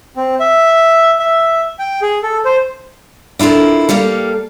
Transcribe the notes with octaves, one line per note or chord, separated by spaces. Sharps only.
C4
E5
E5
G5
G#4
A4
C5
D4 E4 F4 A4 A#4
G3 A#3 A4 F5